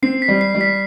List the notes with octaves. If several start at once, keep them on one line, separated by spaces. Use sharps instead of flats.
C4 C7
B6
G3
C7
G3
B6